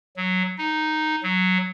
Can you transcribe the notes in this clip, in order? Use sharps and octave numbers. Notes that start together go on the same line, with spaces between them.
F#3
D#4
F#3